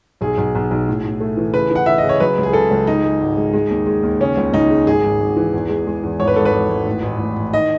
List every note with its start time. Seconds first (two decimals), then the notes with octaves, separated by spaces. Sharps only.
0.21 B1 G#4
0.38 B1
0.55 B1
0.71 B1
0.88 A2
1.04 A2
1.20 A3
1.37 E3
1.54 C#3 B4
1.71 E3 F#5
1.86 E3 E5
1.98 D#5
2.04 C#3
2.09 C#5
2.20 F#3 B4
2.38 C#2
2.43 G#4
2.53 C#3 A4
2.71 C#2
2.87 G#3 D#4
3.04 G#3
3.21 G#1
3.37 G#3
3.53 G#3
3.70 D#2
3.87 G#3
4.03 D#2
4.20 C#3 C#4
4.37 C#2
4.53 C#2 D#4
4.70 G#3
4.86 G#1 G#4
5.04 G#1
5.21 G#1
5.37 E3
5.53 E2
5.69 G#3
5.87 G#3
6.03 E2
6.19 G#1 C#5
6.28 B4
6.36 G#1 A4
6.45 B4
6.52 G#1
6.70 G#1
6.87 A2
7.02 A1
7.19 A1
7.36 A1
7.53 D#3 D#5